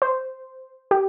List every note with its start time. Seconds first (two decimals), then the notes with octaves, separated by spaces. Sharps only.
0.02 C5
0.91 G4